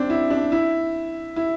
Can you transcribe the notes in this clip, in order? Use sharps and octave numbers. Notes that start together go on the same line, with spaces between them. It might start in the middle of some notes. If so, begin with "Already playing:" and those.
Already playing: C4 D4
E4
D4
E4
E4